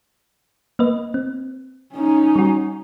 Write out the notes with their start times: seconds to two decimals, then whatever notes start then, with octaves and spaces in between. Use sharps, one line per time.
0.79 A#3 B4 D#5
1.14 C4
1.94 C#4 D#4
2.36 G3 F#4